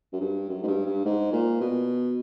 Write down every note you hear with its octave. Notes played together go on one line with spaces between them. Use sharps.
F#2
G2
F#2
G#2
G2
G2
G#2
A#2
B2